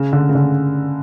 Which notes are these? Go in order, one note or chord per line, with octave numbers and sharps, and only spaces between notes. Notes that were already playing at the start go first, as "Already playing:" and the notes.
Already playing: C#3
D3
C#3
D3